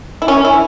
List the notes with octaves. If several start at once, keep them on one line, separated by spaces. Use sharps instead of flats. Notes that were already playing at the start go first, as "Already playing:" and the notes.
E4
C#4
E4